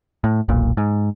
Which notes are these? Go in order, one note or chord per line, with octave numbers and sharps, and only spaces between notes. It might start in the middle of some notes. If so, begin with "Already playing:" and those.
A2
E1 B1 A#2
G#2